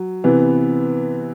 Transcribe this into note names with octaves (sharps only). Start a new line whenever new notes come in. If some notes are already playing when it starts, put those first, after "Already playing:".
Already playing: F#3
C3 E3 B3